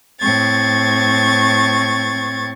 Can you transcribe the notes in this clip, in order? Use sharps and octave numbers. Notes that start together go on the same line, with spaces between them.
A2 C4 C#6 G#6 A6